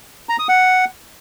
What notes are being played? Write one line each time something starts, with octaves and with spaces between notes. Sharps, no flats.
A#5
D#6
F#5